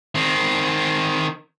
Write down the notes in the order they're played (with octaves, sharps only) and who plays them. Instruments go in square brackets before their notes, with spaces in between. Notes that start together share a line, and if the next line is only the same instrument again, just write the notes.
[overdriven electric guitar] D#3 C4